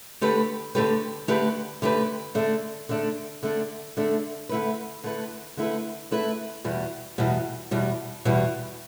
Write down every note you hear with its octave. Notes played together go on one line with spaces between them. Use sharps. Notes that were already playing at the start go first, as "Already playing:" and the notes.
D3 A3 G4 B4
D3 A3 G4 B4
D3 A3 G4 B4
D3 A3 G4 B4
D3 A3 D4
D3 A3 D4
D3 A3 D4
D3 A3 D4
D3 A3 E4 B4
D3 A3 E4 B4
D3 A3 E4 B4
D3 A3 E4 B4
E2 B2 G3
E2 B2 G3
E2 B2 G3
E2 B2 G3